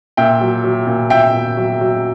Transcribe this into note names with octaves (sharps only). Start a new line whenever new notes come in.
A#2 E5 G5
F#3
F#3
A#2
A#2 E5 G5
A#2
F#3
F#3